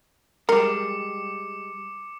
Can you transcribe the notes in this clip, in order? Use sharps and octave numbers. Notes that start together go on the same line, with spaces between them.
G3 G#3 A#4 D6 C#7